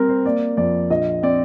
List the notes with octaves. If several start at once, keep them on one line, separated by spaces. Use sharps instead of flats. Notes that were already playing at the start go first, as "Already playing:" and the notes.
Already playing: G3 C4 A#4
C5
A#3 D5
F2 D5
A#1 D#5
C4 D5